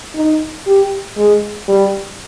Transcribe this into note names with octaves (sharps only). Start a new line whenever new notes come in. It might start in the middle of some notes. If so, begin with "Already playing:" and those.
D#4
G4
G#3
G3